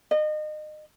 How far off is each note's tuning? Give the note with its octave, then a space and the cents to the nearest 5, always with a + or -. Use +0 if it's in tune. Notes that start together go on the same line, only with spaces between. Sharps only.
D#5 -30